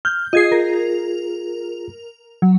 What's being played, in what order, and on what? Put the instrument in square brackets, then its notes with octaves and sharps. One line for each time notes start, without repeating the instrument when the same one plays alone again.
[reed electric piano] F6 [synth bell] G6
[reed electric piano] F4 G#4 [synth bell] D#5 G#6 C7
[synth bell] A#4
F#3